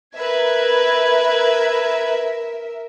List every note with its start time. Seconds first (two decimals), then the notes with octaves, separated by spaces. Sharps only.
0.16 A#4 B4 E5 G#6